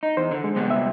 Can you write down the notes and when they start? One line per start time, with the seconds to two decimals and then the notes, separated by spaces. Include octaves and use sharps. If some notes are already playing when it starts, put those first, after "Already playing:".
0.03 D#4
0.17 E2 C5
0.31 D3
0.44 G#3
0.56 C3 G3 B3
0.70 E5